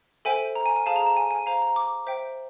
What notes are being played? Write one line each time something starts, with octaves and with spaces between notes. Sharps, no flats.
A4 C5 E5 G5 G#5
A#5
G#5
G#5
G#4 C5 F5 A5
A#5
A5
G#5
G#5
C5 F5 A#5
A#5
D6
C5 E5 G5